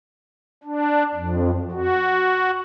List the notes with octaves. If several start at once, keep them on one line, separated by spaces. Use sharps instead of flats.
D4
F2
F#4